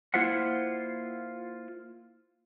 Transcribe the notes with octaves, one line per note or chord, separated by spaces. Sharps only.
A#3 E4 F4 C5 E5 F#5